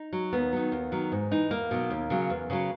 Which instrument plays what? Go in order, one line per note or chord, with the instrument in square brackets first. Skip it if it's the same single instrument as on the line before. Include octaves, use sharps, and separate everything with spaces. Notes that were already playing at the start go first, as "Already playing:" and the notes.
Already playing: [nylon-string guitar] D#4
F#3
D#2 B3
D#3 F#3
D#2
D#3 F#3
G#2
E3 D#4
E2 A#3
B2 F#3
D#2
C#3 F#3
E2
C#3 F#3